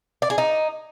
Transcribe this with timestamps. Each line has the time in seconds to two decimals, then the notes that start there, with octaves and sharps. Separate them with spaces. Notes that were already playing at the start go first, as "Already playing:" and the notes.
0.22 D5
0.30 G#4
0.38 D#4